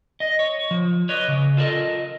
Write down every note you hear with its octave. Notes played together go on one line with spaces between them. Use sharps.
D#5
C#5
F3
B4 C#5 D#5
C#3
F4 A4 A#4 D5 D#5